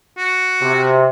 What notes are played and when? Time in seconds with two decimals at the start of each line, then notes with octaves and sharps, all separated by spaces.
0.18 F#4
0.62 C3